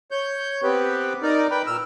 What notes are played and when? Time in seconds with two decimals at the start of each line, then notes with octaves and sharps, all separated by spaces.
0.11 C#5 G6
0.63 B3 C4 G4 B4
1.22 D#4 A#4 D5
1.51 B4 G5 B5
1.66 A#2 E6 F6